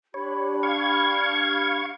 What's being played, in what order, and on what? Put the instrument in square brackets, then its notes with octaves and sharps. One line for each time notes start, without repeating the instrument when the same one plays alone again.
[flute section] D4 G4 B5 [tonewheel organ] C#5
[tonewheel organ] F5 C#6 G#6